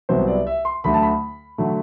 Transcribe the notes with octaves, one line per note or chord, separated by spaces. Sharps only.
C2 C3 F#3 B3 C5
D5
E5
C6
D2 D3 F#3 A3 B5
A5
B5
D3 F#3 A3